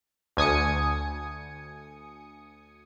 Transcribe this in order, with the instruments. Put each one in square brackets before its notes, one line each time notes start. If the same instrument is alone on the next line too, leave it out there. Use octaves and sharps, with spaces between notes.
[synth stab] D2 G#5 D#6 C#7